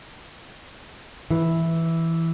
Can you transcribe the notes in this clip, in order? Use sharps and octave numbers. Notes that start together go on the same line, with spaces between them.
E3